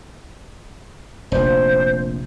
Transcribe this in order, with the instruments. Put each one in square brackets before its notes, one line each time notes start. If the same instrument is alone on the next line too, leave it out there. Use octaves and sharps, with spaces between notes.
[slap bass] F1 A#1 [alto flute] C5